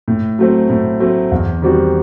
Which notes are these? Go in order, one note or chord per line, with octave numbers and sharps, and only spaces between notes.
A2
F#3 A3 C4
A2
F#3 A3 C4
E2
D#3 G3 C4 F#4